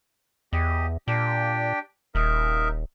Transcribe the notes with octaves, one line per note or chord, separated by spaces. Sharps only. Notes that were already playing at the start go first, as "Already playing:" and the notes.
E2 G4 D#5
A#2 D4 G4 G5
D#1 D#4 A#4 E5